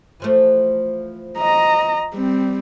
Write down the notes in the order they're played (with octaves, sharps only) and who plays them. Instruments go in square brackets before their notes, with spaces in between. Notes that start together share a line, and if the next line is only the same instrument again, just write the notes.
[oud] E3 F3 A3
[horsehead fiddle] D#5 A#5
G3 C4